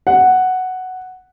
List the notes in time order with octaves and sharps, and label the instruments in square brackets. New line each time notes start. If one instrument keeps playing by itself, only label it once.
[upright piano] F#5